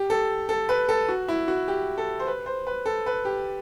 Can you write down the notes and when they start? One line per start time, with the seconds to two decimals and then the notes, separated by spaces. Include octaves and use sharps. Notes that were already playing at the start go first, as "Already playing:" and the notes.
Already playing: G4
0.10 A4
0.49 A4
0.69 B4
0.89 A4
1.09 F#4
1.28 E4
1.48 F#4
1.68 G4
1.98 A4
2.19 C5
2.27 B4
2.46 C5
2.67 B4
2.86 A4
3.06 B4
3.25 G4